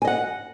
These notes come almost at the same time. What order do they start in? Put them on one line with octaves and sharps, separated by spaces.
G#5 D#5 F#5